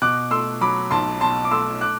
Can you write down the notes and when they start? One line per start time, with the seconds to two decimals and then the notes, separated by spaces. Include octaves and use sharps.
0.02 B2 D6 F#6
0.31 A3 C6 E6
0.61 F#3 B5 D6
0.91 B1 A5 C6
1.21 B2 A5 C6
1.44 D6
1.51 A3 C6 E6
1.81 D6 F#6